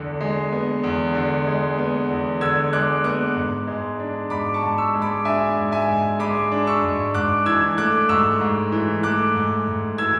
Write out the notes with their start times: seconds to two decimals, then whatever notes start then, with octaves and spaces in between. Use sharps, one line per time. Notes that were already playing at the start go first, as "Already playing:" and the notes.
Already playing: E2 D3
0.21 G#3
0.52 B3
0.83 E2
1.15 D3
1.47 G#3
1.78 B3
2.10 E2
2.41 D3 E6 G#6
2.73 G#3 D6 F#6
3.04 B3 D6 F#6
3.36 G#2
3.67 G#3
3.99 D4
4.30 G#2 B5 D6
4.54 A5 C#6
4.62 G#2
4.78 C#6 E6
4.94 G#3
5.02 B5 D6
5.25 D4 E5 G#5
5.57 G#2
5.72 E5 G#5
5.88 G#2
6.19 G#3 B5 D6
6.52 D4
6.67 C#6 E6
6.83 G#2
7.14 G#2 D6 F#6
7.46 E3 E6 G#6
7.77 A3 D6 F#6
8.09 G#2 C#6 E6
8.41 G#2
8.72 E3
9.03 A3 D6 F#6
9.35 G#2
9.67 G#2
9.98 E3 E6 G#6